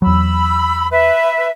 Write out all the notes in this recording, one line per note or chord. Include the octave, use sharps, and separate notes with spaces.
E2 F#3 B5 E6
B4 E5